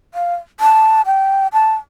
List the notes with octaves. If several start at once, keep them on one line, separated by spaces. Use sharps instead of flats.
F5
A5
G5
A5